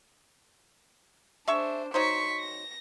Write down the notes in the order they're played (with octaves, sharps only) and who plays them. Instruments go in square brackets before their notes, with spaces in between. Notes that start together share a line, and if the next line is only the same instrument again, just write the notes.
[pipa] G#3 E5 C#6 [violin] D4 C5
[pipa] F#3 D#4 C5 [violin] C#6 B6
[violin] A#6